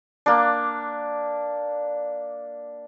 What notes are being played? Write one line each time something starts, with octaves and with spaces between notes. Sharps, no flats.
A#3 D4